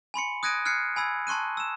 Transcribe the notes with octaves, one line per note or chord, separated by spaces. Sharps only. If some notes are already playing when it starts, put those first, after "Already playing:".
G#5 B5 C6 C#7
D#6 F#6 G#6 A#6 D7 D#7
F6 F#6 G#6 C7 C#7
G#5 B5 E6 G#6
A5 C6 C#6 F#6 D#7
E6 E7